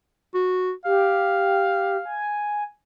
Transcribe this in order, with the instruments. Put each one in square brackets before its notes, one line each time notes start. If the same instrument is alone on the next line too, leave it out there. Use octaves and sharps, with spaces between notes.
[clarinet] F#4
[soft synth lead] G4 [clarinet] F5
[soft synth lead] G#5